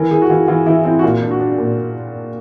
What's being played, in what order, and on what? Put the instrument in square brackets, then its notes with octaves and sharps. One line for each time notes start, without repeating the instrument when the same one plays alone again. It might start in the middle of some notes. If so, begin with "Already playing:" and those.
Already playing: [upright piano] E3 [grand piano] A#4
[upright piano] E3 [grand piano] G#4
[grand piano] F#4
[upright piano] E3 [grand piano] F4
[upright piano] E3 [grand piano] F4
[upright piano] E3 [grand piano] E4
[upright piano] C4 [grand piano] E4
[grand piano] F#4
[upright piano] A#2 [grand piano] F4
[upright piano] D4
[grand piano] F#4
[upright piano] D4
A#2